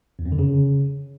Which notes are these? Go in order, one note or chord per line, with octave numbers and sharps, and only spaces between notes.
E2
F2
D3
C#3